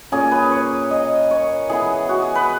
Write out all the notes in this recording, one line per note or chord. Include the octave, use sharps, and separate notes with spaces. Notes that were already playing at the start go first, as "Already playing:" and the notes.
A#2 A#3 C#4 G#4
B4
C#5
D#5
C#5
E3 B3 G#4
F#4
G#4
B4